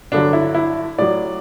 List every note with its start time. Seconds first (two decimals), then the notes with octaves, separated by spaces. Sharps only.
0.12 G2 D3 F#3 D4
0.33 E4
0.54 E4
0.98 A2 F#3 D5